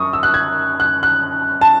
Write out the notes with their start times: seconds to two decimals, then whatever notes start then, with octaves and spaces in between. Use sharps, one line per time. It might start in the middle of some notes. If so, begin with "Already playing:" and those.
Already playing: F#2 C#6 D#6
0.13 E6
0.23 F#6
0.34 G#6
0.80 F#6
1.03 F#6
1.61 A5